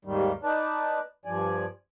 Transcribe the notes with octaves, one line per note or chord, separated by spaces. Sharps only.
D#2 G#2 D#3 G3
D#4 B4 D5 A5
G2 F3 D5 G#5